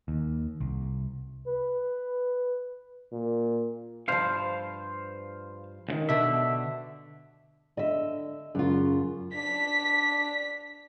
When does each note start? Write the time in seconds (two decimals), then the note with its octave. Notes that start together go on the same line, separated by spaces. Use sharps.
0.08 D#2
0.61 C2
1.47 B4
3.12 A#2
4.08 G2 F3 C5 F5
5.89 D#2 D#3
6.09 B2 D3 E5
7.77 D3 D#5 E5
8.55 F#2 C#3 F4
9.35 D4 B6